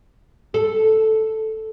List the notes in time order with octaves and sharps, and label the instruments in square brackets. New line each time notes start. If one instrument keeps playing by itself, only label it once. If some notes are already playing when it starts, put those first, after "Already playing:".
[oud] A4